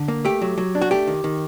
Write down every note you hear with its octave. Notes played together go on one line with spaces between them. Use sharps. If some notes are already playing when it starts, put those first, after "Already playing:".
Already playing: D3
A#3
A3 G4
F#3
F#3
D4
F#4
A3 G4
D#3
D#3